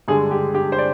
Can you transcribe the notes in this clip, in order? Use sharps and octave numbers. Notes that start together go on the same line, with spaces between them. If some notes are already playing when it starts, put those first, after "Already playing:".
G2 D3 G#3 G#4
G4
G4
C5
D5